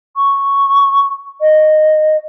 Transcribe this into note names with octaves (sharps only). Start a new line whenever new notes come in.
C#6
D#5